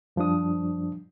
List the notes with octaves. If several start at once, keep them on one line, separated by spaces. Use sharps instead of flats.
F#2 F3 G3 D4 D#6